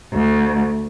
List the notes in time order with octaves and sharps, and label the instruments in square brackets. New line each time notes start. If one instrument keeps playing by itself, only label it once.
[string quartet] D2